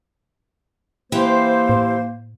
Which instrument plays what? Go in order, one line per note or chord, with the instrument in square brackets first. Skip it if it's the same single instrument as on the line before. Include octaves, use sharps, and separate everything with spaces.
[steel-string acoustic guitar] E3 G4 [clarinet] A#3 [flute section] C5
[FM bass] A2